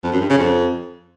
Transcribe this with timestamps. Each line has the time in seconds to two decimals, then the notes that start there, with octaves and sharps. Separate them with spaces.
0.03 F2
0.12 F#2
0.21 G2
0.29 C#3
0.38 F2